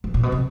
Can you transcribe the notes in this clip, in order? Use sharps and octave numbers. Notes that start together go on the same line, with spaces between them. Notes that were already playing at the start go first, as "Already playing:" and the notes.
G#2
A#2
B2
C3